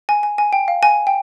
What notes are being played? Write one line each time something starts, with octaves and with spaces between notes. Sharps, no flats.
G#5
G#5
G#5
G5
F5
G#5
G5